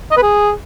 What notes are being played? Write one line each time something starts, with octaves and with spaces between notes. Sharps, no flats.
D#5
B4
G#4